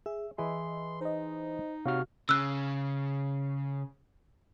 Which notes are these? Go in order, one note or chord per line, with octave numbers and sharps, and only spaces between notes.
G#4 E5
E3 E4 G#4 D#5 C6
D#4 C5 D#5
C3 F#4 C#5 F5 F6
C#3 E6 F#6